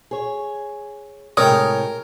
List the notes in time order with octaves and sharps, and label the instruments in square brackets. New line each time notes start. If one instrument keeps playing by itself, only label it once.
[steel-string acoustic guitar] G#4 C#5
[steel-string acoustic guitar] A2 C3 G#3 [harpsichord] A#4 [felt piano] C#5 G5 [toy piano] D#6